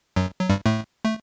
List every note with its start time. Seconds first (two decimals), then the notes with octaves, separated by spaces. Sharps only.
0.16 F#2 F#3
0.39 F#3
0.49 G2 G3
0.66 A2 A3
1.05 A3